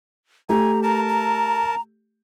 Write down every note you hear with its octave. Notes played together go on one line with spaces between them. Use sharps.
A3 G4 G#5 A#5
A#4 A5 A#5
A#5